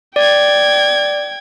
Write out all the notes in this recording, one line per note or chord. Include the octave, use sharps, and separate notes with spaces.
D5 G5 G#6